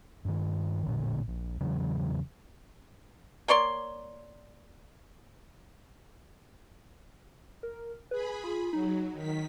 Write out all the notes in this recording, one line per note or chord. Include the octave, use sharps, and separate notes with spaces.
G2 D#3
A1 A#2 D3
A#1
E2 C#3 E3 F#3
A#3 C#5 D5 C6
A#4
G#4 B4 B5
F4
F#3 D#4
D#3 B6